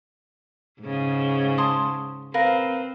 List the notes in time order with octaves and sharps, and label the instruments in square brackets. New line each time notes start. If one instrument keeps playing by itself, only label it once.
[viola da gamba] G#2 C#3
[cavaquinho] A5 C6 D#6
[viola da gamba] C4 [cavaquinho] A#4 B4 F5